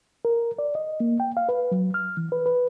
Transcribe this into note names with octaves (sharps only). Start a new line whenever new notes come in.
A#4
D5
D#5
A#3
G5
F5
B4
F#3
F6
E3
B4
B4